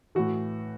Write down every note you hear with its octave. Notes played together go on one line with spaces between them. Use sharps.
A2 E3 F#4